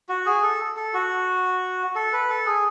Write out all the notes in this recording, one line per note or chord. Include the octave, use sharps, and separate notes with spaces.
F#4
G#4
A4
A4
F#4
A4
B4
A4
G#4